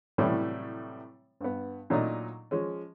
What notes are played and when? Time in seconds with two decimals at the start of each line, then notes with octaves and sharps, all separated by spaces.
0.18 A2 C3 E3 F#3 G3 A3
1.41 G2 B3
1.90 A#2 F#3 A3 D4 D#4
2.51 F3 G#3 C#4